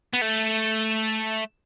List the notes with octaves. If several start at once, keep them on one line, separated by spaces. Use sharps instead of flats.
B3
A3